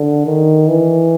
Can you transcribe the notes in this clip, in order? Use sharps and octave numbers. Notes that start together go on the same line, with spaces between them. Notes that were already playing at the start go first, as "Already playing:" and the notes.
Already playing: D3
D#3
E3